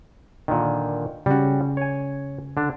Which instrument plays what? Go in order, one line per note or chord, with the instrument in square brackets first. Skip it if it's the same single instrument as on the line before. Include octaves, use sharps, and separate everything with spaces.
[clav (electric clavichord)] A#2 D3 D#3
[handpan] C#3 C#4 [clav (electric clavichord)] G3 F#4
[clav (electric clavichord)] C#5 G#5
D3 D4